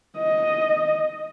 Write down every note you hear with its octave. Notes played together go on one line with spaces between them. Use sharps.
D#5